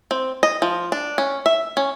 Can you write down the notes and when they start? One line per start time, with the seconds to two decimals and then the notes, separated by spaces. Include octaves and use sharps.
0.11 C4
0.43 D#5
0.62 F3
0.92 D4
1.18 C#4
1.46 E5
1.77 C#4